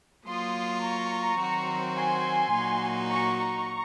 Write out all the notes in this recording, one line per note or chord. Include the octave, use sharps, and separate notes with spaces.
F#3 A#3 F4 C6 D#6
A#5 C#6
D#3 F#3 C4 F#4 C5
G#5 C6
A#2 F#3 A#3 D#4 F#4
A#5 C#6
A#5 C#6